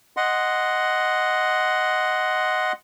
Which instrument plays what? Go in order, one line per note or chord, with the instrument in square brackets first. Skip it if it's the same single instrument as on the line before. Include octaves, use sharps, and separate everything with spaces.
[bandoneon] D#5 F#5 C6